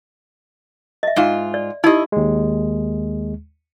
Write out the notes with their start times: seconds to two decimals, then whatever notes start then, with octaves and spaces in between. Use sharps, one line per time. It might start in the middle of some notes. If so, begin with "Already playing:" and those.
1.03 D#5 E5
1.16 G#2 F4
1.54 D5
1.84 D#4 E4 G4 D#5
2.12 D#2 G#3